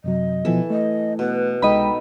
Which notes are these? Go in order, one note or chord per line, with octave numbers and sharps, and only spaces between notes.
F#2 C3 F#3 D#5
B2 E3 F3 B3 A4
A3 D#5
B2 B4
C2 G#3 D#4 A4 D#5 G5 B5